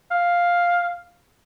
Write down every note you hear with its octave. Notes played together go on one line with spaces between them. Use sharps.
F5